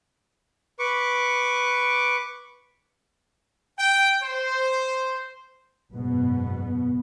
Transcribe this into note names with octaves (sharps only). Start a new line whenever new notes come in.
B4 C#6 D6
G5
C5
F#1 G#2 B2 B3